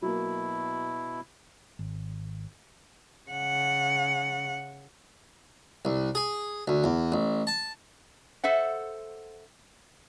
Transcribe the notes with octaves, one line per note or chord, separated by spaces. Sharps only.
B2 F#3 A#3 E4
G#1
C#3 F#5
C2
G#4
D2
E2
A1
A5
A4 C5 E5 F#5